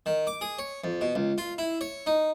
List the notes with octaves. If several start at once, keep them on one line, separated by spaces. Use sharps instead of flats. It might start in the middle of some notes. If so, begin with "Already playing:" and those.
D#3
D6
G#4
C#5
F2
B2
C#2
F4
E4
C#5
D#4